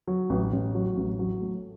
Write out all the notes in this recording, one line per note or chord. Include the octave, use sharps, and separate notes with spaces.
F#3
A1
A1
F#3
A1
F#3
A3